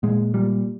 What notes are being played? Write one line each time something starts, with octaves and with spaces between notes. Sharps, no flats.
A#2 G#3
A#2 G3